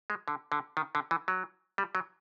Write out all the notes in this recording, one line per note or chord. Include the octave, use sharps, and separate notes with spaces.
G#3
D3
D3
D#3
D3
E3
F#3
G3
F#3